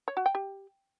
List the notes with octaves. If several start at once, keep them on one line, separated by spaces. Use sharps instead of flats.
C#5
F#4
G5
G4